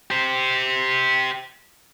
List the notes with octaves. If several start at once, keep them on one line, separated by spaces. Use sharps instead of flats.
G4 C5